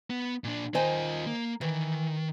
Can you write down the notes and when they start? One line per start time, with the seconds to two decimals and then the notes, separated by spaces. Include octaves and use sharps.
0.10 B3
0.44 A#2 D4
0.74 D#3 F4 C5 D#5 G#5
1.26 A#3
1.61 D#3 E3